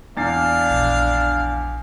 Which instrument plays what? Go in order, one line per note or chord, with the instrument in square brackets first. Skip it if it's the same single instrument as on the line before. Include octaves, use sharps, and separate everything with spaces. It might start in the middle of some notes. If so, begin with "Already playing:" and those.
[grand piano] E2 A6 C7 [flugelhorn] D4 [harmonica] F5
[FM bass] A#1